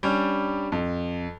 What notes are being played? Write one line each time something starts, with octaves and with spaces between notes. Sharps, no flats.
G3 C#4 D4
F2